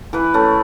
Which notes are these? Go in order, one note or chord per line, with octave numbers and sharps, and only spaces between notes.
E3 B4
A3 C#4